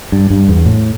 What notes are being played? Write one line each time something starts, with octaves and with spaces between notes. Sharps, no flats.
G2
G2
E2
A2